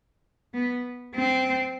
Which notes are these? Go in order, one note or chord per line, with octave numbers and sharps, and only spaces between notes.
B3
C4